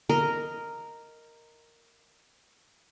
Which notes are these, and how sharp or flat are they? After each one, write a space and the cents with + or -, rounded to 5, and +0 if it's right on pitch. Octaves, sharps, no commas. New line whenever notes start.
A#4 -5 D#5 +0